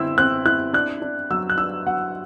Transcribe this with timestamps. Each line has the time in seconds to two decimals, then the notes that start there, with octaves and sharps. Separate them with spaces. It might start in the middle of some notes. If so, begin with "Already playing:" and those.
Already playing: D3 C4 E4 E6
0.18 C4 F#6
0.45 E4 F#6
0.73 D4 F#6
1.02 D4
1.31 F#3 E6
1.50 F#6
1.58 D4 E6
1.87 F#3 F#5